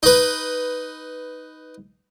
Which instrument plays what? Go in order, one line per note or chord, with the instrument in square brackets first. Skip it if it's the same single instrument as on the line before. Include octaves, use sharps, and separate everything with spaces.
[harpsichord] D#4 B4